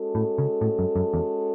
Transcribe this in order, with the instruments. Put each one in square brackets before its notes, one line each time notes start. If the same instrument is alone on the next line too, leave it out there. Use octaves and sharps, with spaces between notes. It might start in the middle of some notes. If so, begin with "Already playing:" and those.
Already playing: [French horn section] G#3 C#4 F#4 A4
[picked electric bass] A2
C#3
A2
F#2
F#2
E2